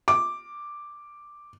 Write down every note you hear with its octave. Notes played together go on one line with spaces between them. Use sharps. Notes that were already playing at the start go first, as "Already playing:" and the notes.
D6